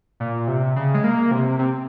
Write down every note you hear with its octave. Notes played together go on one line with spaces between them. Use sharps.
A#2
C3
C#3
G#3
A#3
C3
C3